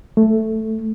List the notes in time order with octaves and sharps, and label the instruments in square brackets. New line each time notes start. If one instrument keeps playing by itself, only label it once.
[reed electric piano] A3